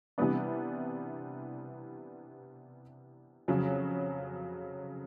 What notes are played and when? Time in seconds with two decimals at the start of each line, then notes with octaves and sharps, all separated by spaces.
0.18 C3 E3 G3 B3 D4
3.48 F2 C#3 F#3